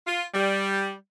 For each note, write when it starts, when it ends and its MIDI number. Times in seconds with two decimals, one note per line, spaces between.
0.07 0.24 65
0.34 0.94 55